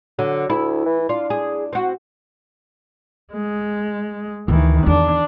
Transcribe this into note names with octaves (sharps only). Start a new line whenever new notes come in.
D3 F#3
D2 E4
E3
D4 F4
G#4
C4 F#4
G#3
D2 D#3 E3
E2 D4